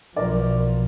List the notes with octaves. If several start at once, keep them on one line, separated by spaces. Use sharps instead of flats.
B1 F3 A#4 D5